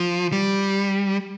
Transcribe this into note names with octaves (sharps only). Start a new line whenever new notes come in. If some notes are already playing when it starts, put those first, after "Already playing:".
Already playing: F3
G3